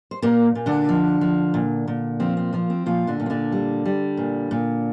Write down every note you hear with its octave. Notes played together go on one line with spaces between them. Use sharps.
C5
A#2 A#3 A#4
A#2
D3 D4
F3
F3
A#2
A#2
F3 C4
C4
F3 A#3
C4
A#2 F3 F4
D3 D4
A#2
C4
D3 D4
G3
G3
A#2
A#2